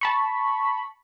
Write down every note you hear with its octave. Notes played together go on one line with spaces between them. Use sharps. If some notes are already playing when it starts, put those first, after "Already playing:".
A5 B5 C#6